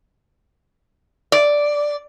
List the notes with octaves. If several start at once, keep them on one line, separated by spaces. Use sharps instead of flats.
D5